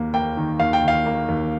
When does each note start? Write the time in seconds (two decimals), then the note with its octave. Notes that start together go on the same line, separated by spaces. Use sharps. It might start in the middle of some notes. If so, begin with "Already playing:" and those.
Already playing: D#2 A#3
0.14 A#3 G5
0.37 D#3
0.59 D#2 F5
0.73 G5
0.83 D#3
0.88 F5
1.06 A#3
1.28 D#2